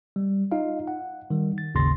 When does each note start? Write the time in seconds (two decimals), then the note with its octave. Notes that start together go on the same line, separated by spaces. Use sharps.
0.16 G3
0.52 D#4 F4 D#5 F5
0.88 F#5
1.30 D#3 G3
1.58 A6
1.75 G#1 D#2 C#3 C6 A6 A#6